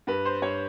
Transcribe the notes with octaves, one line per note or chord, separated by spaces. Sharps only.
G2 B4
C5
G2 C#5